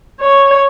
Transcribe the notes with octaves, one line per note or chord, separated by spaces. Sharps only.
C#5